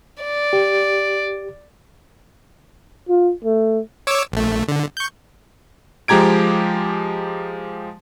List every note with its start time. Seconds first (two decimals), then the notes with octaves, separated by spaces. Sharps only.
0.23 D5
0.53 G4
3.09 F4
3.44 A3
4.07 C#5 D6 E6
4.32 A#1 A3
4.68 D3
4.97 C#6 G6
6.08 F3 G#3 G4 A#5 G#6 D7